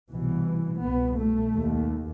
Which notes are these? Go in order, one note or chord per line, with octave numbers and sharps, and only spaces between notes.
C2 B2 E3
C2 B2 B3
A3
D#2